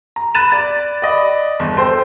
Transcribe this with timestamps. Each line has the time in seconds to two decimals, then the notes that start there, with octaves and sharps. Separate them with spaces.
0.16 A#5
0.35 B5 F#6 A6 D#7 E7
0.52 D5 A6
1.02 D5 D#5 B5
1.59 G1 E2
1.77 A4 C5 G5